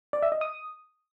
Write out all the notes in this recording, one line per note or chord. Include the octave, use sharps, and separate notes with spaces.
D5
E5
D#5
D#6